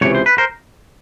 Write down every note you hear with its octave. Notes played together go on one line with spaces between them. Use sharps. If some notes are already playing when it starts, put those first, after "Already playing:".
C#2 C3 E3 C#5
C5
B4
A#4 C5